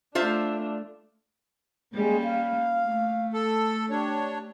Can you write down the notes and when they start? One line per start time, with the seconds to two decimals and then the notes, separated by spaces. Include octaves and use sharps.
0.15 A3 D4 F4 C5 E5
1.94 G3 G#3 A#3 C#4
2.24 F5
2.85 A3
3.33 A4
3.90 D4 G4 C#5